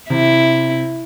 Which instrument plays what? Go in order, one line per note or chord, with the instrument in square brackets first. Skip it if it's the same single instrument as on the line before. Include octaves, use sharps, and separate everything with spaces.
[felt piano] C3 [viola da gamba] E4